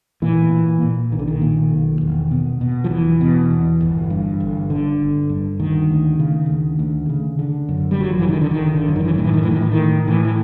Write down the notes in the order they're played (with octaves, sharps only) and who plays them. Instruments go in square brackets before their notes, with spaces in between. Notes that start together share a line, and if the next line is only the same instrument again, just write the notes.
[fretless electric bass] A#2 E3
A#2
A#2
B1 D#3
D3
D#3
A#2
B1
E1
B2
B2
F3
E1 E3
B2
E2
G1
G2
G1
D3
G1
G2
D2 D#3
D2
C#3
D2
D2
C#3
D3
F#2
G3
G#1 F#3
F3
E3
D3 D#3
D3
D#3
G#1
D3
F#2
D#3
E3
A2 D#3
E3
D#3
E3
A2 D#3
E3
D#3
A2
A2 E3
E3